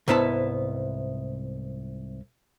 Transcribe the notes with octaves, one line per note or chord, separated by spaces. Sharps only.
C2 G#2 B3 E4 E5 A5